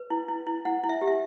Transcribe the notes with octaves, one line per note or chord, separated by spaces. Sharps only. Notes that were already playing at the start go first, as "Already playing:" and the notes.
Already playing: B4
E4
E4
E4
E4 F#5
E4
E5
G4
E5